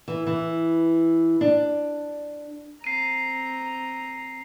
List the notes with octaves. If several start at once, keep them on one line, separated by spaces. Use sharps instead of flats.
E3
E3
D4
C4 A#5 C7 D#7